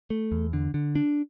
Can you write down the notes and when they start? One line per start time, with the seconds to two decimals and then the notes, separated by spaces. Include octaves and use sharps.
0.10 A3
0.32 E2
0.53 D3
0.74 D3
0.95 D4